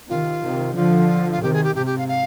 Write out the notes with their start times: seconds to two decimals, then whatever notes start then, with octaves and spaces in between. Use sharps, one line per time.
0.09 C3 D#3 F4
0.43 C3 D#3
0.76 D3 F3 F4
1.31 F4
1.42 C3 D#3 G4
1.53 G#4
1.64 G4
1.75 G#2 C3 G4
1.86 G4
1.98 F5
2.08 F5